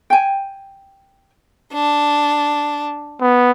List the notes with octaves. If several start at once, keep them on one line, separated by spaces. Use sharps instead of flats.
G5 G#5
D4
B3